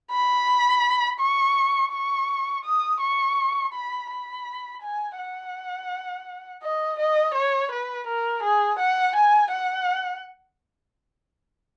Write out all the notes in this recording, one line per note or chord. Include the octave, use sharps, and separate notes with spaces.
B5
C#6
C#6
D#6
C#6
B5
B5
G#5
F#5
D#5
D#5
C#5
B4
A#4
G#4
F#5
G#5
F#5